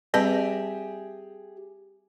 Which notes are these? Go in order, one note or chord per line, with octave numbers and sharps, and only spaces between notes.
G3 C4 G4 G#4 B4 E5